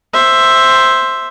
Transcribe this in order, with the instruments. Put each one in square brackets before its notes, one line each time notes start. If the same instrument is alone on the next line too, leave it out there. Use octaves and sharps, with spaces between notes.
[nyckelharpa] C5 E5